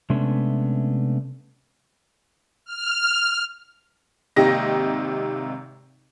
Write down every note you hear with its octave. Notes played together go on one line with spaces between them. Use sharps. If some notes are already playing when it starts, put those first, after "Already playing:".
C3 G#3 A3 B3 C#4 D4
F6
G#1 C3 A#3 D#4 G4 A#6